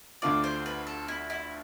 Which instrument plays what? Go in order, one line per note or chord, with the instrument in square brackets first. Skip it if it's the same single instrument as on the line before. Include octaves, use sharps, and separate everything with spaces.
[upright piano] D2 D3 A3 D4 F4 [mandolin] D5
[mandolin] C5
B4
A4
E4
E4